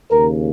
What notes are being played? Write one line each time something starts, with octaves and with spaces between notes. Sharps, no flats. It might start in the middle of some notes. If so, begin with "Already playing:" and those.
D#2 C#3 A#4